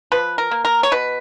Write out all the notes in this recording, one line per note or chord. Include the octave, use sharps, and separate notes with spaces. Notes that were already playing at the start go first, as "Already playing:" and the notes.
F3 B4
A#4
A#3
A#4
C#5
B2 B4